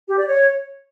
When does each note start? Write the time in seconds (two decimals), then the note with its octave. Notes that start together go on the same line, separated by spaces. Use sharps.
0.08 G4
0.18 D5
0.28 C#5